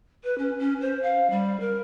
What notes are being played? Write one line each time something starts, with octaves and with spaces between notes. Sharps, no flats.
B4
C#4
C#4
C5
F5
G3
A#4